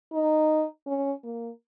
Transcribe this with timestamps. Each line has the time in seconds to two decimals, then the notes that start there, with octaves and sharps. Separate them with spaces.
0.13 D#4
0.87 C#4
1.24 A#3